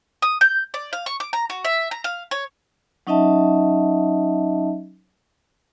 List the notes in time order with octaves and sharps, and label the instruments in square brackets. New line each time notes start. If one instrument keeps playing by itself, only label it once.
[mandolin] D#6
G6
D5
F5
C#6
D6
A#5
F#4
E5
A#5
F5
C#5
[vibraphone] F#3 C#4 D#4 D#5 E5 A5